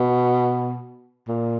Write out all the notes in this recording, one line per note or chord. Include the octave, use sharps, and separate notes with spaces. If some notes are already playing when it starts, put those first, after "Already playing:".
Already playing: B2
A#2